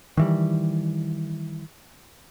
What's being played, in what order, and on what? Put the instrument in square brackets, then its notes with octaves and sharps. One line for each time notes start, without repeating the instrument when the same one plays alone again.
[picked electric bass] D#3 E3 G3